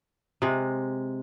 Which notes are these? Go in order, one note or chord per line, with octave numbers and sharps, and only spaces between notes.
C3 G#3